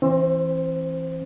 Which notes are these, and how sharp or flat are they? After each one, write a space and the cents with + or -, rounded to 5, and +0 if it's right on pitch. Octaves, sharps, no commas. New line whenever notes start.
E3 +0 C4 +35 C5 +0